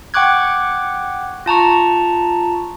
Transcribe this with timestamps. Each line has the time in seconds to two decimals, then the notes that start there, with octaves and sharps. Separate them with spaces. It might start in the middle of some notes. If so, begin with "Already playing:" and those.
0.14 F#5 G5 C#6 D6 F#6 G#6
1.46 F4 A5 A#5 C#6